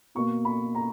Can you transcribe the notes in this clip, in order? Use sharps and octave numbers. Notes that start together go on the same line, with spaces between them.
B2 A#3 C#6
B5
A#5